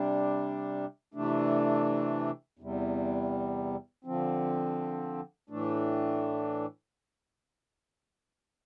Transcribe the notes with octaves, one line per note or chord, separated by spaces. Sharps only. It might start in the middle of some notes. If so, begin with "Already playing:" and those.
Already playing: C3 G3 D4
C3 E3 A3 D4
E2 C3 G3
D3 F3 C4
A2 E3 A3 D4